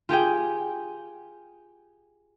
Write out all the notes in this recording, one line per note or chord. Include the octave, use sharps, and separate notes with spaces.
F4 G4 G#4 G5